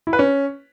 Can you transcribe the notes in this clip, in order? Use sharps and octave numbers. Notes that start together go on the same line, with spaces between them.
E4
B4
C#4